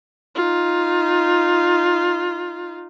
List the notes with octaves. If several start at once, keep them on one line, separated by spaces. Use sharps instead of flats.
D#4 F4